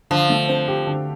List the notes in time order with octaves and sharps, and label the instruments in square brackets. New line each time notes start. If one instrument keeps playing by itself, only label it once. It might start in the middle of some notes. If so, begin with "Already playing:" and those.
[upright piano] D3 [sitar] F3
[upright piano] A3
C4
G4
D3